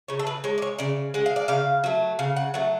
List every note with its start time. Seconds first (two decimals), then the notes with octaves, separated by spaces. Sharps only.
0.08 C#3 C#5
0.19 A4
0.27 B4
0.44 G#3 C#5
0.58 D5
0.62 C#5
0.78 C#3 D5
1.14 G#3 F#5
1.26 F5
1.36 D5
1.48 C#3 F5
1.84 F#3 A3
2.19 C#3 F5
2.36 F#5
2.54 F#3 A3 F#5